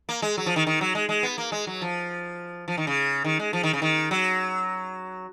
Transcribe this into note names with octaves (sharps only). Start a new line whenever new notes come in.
A#3
G#3
F#3
F3
D#3
D#3
F#3
G#3
G#3
B3
A#3
G#3
F#3
F3
F3
D#3
C#3
D#3
G#3
F3
D#3
C#3
D#3
F#3